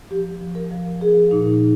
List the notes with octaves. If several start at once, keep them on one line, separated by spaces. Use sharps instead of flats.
F3 G4
F3
A#4
F3
F3 G#4
A#2 D#4